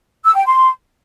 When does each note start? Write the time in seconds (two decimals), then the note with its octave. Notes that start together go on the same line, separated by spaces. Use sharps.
0.25 E6
0.35 G5
0.46 C6